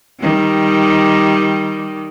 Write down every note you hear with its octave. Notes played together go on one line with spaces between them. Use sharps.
D#3 G3